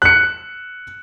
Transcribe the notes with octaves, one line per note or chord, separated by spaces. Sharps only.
F#6 C#7